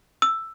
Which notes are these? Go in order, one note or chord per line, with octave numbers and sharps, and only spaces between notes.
E6